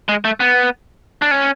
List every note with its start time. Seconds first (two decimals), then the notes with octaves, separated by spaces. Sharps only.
0.09 G#3
0.25 A3
0.40 B3
1.22 D4
1.31 C#4